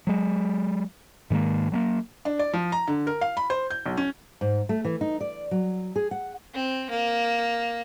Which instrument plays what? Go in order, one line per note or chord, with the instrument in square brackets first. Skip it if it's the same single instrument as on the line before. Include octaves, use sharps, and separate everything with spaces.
[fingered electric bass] F#3 G#3
G#2 D#3 G#3 A#3
F#3 A3 A#3
[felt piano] D4
D5
F3
A#5
D3
A#4
F5
B5
C5
G6
B1
C#4
[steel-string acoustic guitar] G#2
A3
E3
D#4
D5
F#3
G#4
F#5
[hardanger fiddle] C4
A#3